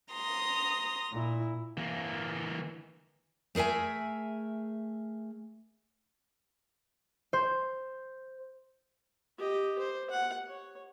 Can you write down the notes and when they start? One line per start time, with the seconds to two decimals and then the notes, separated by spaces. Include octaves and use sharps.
0.12 A#5 C6 D#6
1.11 A#2 E4
1.78 E3 A#3
3.55 A3 G#4 A#4 E5 G#5
7.33 C5
9.38 G4 D#5
9.78 C5
10.10 F#5
10.48 C#5